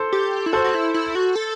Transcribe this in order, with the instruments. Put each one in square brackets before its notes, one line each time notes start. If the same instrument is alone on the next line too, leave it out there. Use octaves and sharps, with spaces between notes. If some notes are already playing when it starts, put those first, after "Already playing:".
Already playing: [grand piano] A4 C5
[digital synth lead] G4
E4
[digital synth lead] F#4 [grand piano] A4 C5
[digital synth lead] F#4
E4
E4
F#4
A4